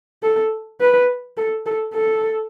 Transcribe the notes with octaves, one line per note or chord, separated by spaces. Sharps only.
A4
B4
A4
A4
A4